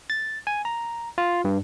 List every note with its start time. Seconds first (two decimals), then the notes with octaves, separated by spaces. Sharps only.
0.10 A6
0.47 G#5
0.65 A#5
1.18 F4
1.45 G2